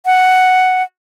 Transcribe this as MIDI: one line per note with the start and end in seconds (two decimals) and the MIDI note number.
0.06 0.83 78